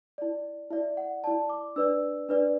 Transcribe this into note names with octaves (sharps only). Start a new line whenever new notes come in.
E4 D5
E4 D5 E5
F#5
E4 D5 A5
D6
D4 B4 D5 E6
D4 B4 D5